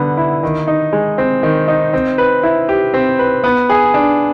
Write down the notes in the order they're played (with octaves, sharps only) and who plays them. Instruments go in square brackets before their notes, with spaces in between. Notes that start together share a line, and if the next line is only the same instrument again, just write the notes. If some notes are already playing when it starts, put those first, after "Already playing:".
Already playing: [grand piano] D3 G3 B3
E4
D#3
D#4
G#3
C4
D#3
D#4
C4
B4
E4
G4
C4
B4
B3
G#4
D4